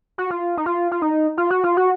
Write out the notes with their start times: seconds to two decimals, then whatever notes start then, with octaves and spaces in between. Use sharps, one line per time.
0.18 F#4
0.30 F4
0.57 D#4
0.66 F4
0.91 F4
1.02 D#4
1.37 F4
1.50 F#4
1.64 F4
1.77 F#4